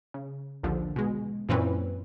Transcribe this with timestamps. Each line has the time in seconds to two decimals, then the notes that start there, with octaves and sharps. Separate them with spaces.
0.14 C#3
0.63 A#1 D#2 D3 F3
0.96 B2 G#3
1.49 F#2 A#2 E3 C4 C#4 B4